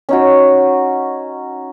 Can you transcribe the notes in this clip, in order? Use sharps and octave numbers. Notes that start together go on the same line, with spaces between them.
C#4 D#4 F#4